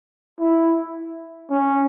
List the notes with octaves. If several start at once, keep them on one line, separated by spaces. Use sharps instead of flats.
E4
C#4